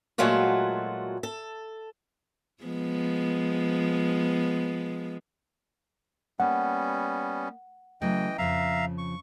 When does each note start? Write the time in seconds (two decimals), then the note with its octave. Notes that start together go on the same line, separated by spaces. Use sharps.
0.18 A#2 F#3 G#3 A3 F4 F#4
1.23 A4
2.63 F3 G#3 B3
6.40 G3 A#3 B3 C#4 F#5
8.02 C#3 E3 F#3 A3 D#5 G5
8.38 F2 C#3 F3 E5 F5 A#5
8.98 C#6